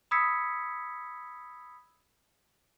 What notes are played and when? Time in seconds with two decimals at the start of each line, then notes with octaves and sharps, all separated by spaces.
0.11 B5 D#6 E6 G#6 B6 C#7